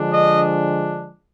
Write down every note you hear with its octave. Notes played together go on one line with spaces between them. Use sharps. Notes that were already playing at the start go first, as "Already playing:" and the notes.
Already playing: D3 F3 G#3 D4
D#5